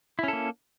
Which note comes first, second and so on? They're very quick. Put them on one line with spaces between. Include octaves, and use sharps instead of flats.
E4 C#4 A4 A#3